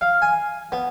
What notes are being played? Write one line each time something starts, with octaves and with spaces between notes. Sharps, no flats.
F5
G#5
B3